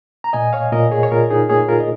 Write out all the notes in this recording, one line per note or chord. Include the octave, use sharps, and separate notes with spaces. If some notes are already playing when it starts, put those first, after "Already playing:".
A#5
A#2 D#5 G#5
C#5 F5
A#2 A#4 D#5
G#4 C#5
C#5
A#2 F4 A#4
D#4 G#4
A#3 G#4 C#5
F4 A#4
D#5